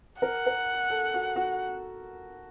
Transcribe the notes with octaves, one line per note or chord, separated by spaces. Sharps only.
A#4 F#5
A#4
A4
F#4
F#4